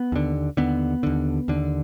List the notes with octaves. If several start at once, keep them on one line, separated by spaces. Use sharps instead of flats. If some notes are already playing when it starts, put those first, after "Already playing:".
Already playing: B3
D#2 D3
D#2 D3 B3
D#2 D3
D#2 D3